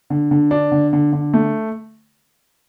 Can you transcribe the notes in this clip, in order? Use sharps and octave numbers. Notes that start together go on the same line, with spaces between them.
D3
D3
D4
D3
D3
D3
A3